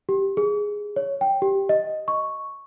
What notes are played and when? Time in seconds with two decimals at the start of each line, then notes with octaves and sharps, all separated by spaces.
0.09 G4
0.37 G#4
0.96 C#5
1.21 G5
1.42 G4
1.69 D#5
2.08 C#6